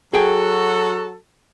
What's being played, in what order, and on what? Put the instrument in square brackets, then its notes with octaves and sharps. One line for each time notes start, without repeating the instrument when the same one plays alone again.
[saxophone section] F#3 F#4 A4 [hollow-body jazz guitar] G#4 G5 G#5